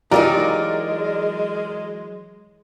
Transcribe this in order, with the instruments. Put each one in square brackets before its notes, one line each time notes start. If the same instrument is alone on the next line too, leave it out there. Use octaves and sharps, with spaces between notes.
[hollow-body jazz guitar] E3 F#3 D#4 [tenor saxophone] G#3 [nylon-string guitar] F4 G4 [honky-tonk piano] A#4 D5